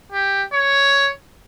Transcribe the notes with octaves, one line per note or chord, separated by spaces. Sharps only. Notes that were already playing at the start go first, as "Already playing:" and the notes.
G4
C#5